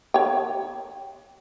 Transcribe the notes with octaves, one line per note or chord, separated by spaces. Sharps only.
C#5 G5